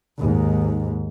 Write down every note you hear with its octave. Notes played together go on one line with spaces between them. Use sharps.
D#2 G#2